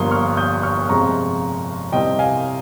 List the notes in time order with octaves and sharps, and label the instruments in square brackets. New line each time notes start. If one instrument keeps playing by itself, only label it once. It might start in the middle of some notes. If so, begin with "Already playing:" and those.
Already playing: [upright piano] G1 G2 F3 A#3 C6 D#6
C#6 F6
D#6 G6
C#6 F6
G1 F2 C3 F3 G#3 A#5 C#6
C2 C3 G3 C4 D#5 G5
F5 G#5